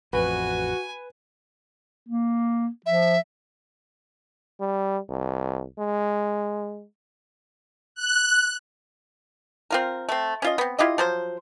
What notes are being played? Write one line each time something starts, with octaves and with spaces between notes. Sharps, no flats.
A1 F2 F#4 B4 G#5
A#3
F3 E5
G3
C2
G#3
F#6
C4 F4 A#4
A3 C4
C#4 F4 D#5
B3 C4
E4 F4 G4 D#5
F3 F#3 C5